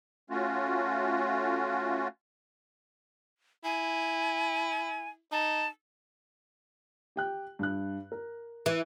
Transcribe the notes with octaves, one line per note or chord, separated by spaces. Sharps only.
A3 C#4 F4 F#4
E4 G#5
D#4 A5
G4 G5 F#6
G2 F#6
A#4
E3